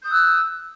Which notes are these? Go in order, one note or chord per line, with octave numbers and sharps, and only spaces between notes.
D#6 E6 F#6 G6